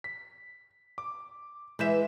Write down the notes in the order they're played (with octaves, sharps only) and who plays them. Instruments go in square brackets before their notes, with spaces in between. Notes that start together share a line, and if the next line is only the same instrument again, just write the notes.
[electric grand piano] B6
D6
[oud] E3 B4 E5 [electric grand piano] G#3 G6 E7